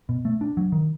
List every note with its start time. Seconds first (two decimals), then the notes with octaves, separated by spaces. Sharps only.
0.09 B2
0.25 A3
0.41 D4
0.57 F#3
0.72 D#3